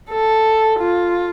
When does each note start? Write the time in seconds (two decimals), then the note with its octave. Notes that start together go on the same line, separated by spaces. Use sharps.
0.11 A4
0.80 F4